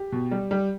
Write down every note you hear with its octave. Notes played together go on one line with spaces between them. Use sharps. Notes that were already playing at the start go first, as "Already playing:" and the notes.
Already playing: G4
B2
G3
G3